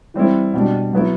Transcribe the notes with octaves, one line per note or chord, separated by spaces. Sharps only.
E3 G3 C4 E4
B2 G3 D4
F#3 B3 E4